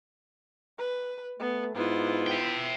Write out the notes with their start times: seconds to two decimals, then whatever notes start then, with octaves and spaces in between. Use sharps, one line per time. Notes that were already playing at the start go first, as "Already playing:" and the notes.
0.78 B4
1.40 A3 B3
1.75 G#2 B3 E4 F4
2.27 E5 G5